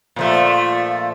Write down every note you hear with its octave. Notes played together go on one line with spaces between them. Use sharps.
A#2 F3 A3